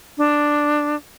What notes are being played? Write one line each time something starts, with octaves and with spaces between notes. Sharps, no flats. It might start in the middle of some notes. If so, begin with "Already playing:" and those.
D4